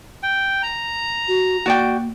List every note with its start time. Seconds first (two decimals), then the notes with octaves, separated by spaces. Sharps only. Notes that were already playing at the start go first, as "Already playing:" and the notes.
0.23 G5
0.63 A#5
1.28 F#4
1.66 A#3 F#4 D5 G5